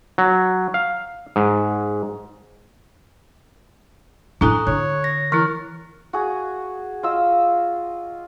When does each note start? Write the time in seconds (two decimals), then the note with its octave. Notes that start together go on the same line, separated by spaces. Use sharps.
0.18 F#3
0.74 F5
1.36 G#2
4.41 A2 D4 E4 A4 G#5 A#5 D#6 F#6
4.67 D3 C#5 F#6
5.04 A#6
5.32 E3 E4 A#4 F6 F#6 A6
6.13 F#4 G#4
7.03 F4 D#5 E6